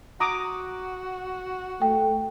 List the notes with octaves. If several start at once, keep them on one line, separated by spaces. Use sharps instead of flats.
F#4 A#5 D6 D#6
A3 G5